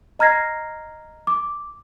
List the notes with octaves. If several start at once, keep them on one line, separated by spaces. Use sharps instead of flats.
D#5 A#5 F6 G#6 A#6 C7
D6